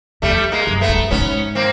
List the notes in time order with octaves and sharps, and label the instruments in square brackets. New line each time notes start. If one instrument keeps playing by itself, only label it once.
[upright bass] E2 [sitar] G3 A3
[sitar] G#3 A#3
[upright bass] F#2
[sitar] A3 B3
[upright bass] G2
[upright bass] G#2 [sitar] B3 C#4
[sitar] A#3 C4